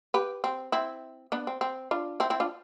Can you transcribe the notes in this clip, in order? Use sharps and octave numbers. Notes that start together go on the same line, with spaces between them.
G4 B4
C4
C4 E4
B3 D4
C4
C4
D4 F4
C4 E4
C4 E4
D4 F4